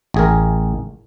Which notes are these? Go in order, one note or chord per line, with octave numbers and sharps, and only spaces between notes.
A1 G#4 A#4